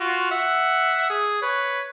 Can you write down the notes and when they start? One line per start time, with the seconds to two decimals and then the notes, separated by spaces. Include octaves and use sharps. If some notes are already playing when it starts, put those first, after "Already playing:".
0.01 F4 F#4
0.31 E5 F#5
1.10 G#4
1.42 B4 C#5